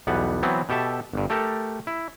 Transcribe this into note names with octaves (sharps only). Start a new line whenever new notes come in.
B1 E2 G3 B3 F#5
E3 F#3 B3 C4
B2 G4 A4 E5 A5
G1 G2
A3 G4 A4 A#4
E4